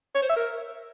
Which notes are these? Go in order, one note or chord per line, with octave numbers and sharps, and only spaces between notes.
C#5
C5
E5
A#4